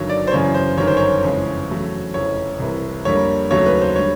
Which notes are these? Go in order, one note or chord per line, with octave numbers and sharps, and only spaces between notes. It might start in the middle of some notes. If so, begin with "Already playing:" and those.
Already playing: G1 G2 D#3 F#3 C#5
D5
C5
F#2 C#3 E3 C#5
C5
G1 F#2 D#3 C#5
C5
C#5
F2 C#3 E3 G#3
E2 C#3 F#3 A3
F1 F2 C#3 E3 C#5
C2 C3 E3
F2 D3 G3 A#3 C#5
D#2 C#3 F#3 A3 C#5
B4
C5
D3 G3 C#5